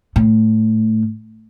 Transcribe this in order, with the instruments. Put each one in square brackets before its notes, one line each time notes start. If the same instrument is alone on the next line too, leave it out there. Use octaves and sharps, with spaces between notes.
[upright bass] A2